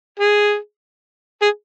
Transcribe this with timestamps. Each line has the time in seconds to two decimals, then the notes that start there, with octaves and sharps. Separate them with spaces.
0.19 G#4
1.42 G#4